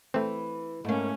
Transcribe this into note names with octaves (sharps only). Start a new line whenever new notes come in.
E3 A3 C4
G#2 A3 A#3 C#4